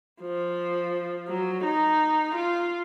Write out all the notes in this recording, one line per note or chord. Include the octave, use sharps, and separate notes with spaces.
F3
F#3
D#4
F4